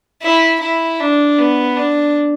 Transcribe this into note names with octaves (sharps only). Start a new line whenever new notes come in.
E4
E4
D4
B3
D4